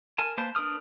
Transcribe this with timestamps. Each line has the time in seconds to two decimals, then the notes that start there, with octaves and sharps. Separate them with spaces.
0.18 A#4 G#5 A5
0.38 A#3 B4 C5 A5
0.55 D4 A#4 B4 D#6 F6